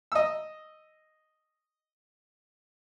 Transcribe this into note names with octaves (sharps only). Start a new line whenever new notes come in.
D#5 E6